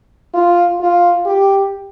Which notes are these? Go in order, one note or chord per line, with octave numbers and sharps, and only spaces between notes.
F4
F4
G4